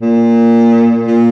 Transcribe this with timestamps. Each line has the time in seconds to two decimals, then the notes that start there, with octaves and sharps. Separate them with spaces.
0.02 A#2
1.07 A#2